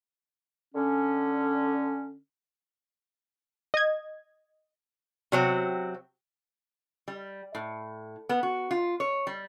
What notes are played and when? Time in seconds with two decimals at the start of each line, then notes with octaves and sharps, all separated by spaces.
0.75 D3 C#4
3.74 D#5 G#6
5.32 C3 F#3 C4
7.08 G3
7.55 A2
8.29 B3
8.43 F#4
8.71 F4
9.00 C#5
9.27 G3